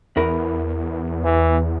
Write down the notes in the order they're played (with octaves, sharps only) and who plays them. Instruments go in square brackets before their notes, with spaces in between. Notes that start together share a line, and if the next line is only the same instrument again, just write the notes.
[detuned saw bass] E2 [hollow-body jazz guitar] E4 A#4 B4
[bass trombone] E3